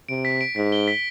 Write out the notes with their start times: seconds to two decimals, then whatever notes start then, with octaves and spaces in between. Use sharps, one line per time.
0.09 C3 D7
0.25 B6
0.41 D7
0.56 G#2 B6
0.72 G7
0.88 B6